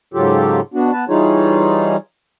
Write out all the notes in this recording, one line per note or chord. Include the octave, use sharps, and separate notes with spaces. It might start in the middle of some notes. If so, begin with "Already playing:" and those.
G#2 C#3 F#3 F4 G4 A4
B2 B3 D4 F#4
B3 B4 A5
E3 G3 D#4 F4 G#4 C#5